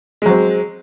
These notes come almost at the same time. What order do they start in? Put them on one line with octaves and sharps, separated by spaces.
G#3 F#3 C4